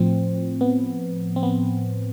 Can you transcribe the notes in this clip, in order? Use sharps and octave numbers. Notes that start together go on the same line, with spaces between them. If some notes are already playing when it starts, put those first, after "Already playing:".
Already playing: A2 F3 C4
B3
C4
B3